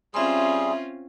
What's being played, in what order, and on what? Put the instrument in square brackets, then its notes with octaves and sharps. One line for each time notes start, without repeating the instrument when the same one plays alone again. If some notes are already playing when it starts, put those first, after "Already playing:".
[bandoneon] G3 G#4 [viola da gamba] C4 C#4 F4 [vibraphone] E5 C6